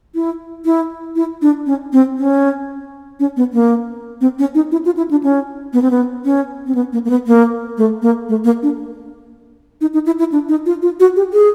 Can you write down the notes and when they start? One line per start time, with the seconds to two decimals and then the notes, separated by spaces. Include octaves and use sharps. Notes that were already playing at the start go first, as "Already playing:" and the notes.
0.15 E4
0.65 E4
1.16 E4
1.42 D4
1.66 C#4
1.93 C4
2.18 C#4
3.20 C#4
3.37 B3
3.53 A#3
4.21 C4
4.39 C#4
4.55 D#4
4.72 E4
4.85 F4
4.97 E4
5.11 D4
5.24 C#4
5.73 B3
5.82 C4
5.91 B3
6.25 C#4
6.67 C4
6.75 B3
6.93 A#3
7.05 A#3
7.10 B3
7.27 A#3
7.78 A3
8.02 A#3
8.29 A3
8.44 A#3
8.63 D4
9.81 D#4
9.94 D#4
10.06 E4
10.19 E4
10.32 D4
10.49 D#4
10.66 F4
10.82 F4
11.00 F#4
11.16 G4
11.33 G#4